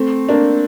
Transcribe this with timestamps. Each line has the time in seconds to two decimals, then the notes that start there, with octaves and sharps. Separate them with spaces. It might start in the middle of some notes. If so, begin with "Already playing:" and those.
Already playing: A3 C4
0.29 A#3 D4